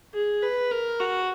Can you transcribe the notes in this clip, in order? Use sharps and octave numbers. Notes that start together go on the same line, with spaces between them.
G#4
B4
A#4
F#4